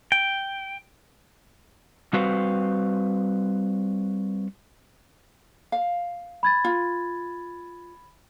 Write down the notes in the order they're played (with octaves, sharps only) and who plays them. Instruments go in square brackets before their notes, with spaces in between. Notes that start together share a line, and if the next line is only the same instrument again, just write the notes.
[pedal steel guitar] G5
[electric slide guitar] G3 C4 F#4 B4 C5 F5
[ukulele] F5
[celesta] B5 G#6 A6
[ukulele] F4